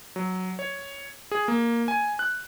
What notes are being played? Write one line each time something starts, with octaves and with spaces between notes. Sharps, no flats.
F#3
C#5
G#4
A#3
G#5
F#6